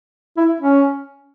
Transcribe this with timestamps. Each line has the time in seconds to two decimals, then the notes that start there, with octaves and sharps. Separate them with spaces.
0.37 E4
0.60 C#4